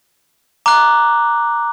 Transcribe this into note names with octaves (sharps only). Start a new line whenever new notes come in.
A#5 D6 F#6